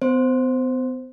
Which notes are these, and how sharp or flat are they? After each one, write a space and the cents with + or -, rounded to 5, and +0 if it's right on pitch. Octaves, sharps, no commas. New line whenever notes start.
B3 +40 C5 +0